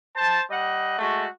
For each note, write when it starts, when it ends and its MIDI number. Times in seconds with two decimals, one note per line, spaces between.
0.16 0.42 72
0.16 0.42 81
0.51 0.95 55
0.51 0.95 75
0.51 0.95 78
0.99 1.26 56
0.99 1.26 57
0.99 1.26 66